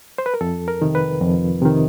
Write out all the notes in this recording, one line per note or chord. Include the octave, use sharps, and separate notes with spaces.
C5
B4
A#4
F2 A4
A#4
C3 D#3
B4
F2
C3 D#3